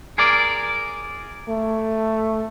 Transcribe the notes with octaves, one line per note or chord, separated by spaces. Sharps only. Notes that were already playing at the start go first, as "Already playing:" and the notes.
G#4 A#4 D5
A3